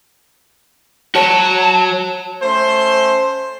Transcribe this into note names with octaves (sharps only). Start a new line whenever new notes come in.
F#4 C#5 A5
A3 C#4 C5 C6